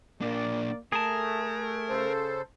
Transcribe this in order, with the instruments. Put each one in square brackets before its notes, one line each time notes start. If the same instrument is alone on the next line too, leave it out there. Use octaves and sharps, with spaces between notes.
[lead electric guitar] A#2 D4 [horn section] A#3 D5
[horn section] A3 [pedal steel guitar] G#4 A5 [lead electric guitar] A#4
[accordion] C#3 A4 C5